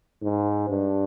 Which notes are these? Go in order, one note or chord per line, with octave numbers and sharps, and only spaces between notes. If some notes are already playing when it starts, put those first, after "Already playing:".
G#2
G2